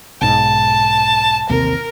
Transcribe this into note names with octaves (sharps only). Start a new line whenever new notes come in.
B1 G#2 A5
A1 D#2 C3 A#4